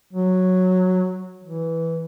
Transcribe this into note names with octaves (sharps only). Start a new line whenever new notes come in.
F#3
E3